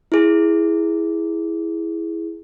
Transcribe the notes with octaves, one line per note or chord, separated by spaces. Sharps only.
E4 G#4